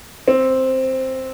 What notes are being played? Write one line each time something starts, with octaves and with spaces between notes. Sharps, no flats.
C4